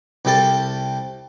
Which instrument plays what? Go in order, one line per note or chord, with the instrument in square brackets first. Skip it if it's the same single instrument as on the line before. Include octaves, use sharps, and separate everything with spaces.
[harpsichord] C2 C3 G3 A4 A5